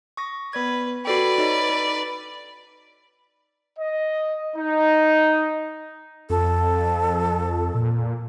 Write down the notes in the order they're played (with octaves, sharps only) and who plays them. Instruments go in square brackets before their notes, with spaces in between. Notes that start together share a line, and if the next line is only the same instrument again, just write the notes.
[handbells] C#6 D#6 A#6
[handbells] B3 D5 G#6 [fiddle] B4
[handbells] F#4 A4 G5 [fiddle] B4 D5
[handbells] D#4 C#5 D#5
D#4
[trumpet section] D#5
D#4
[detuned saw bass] F2 [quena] A4
[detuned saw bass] A#2